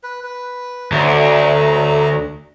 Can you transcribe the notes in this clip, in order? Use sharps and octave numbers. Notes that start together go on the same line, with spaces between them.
B4
B4
D2 F#3 A3 A#5